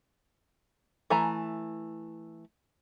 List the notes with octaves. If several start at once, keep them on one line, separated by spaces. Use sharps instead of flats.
E3 A3 G#5 A#5